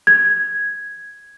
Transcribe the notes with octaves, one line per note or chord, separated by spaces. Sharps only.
G#6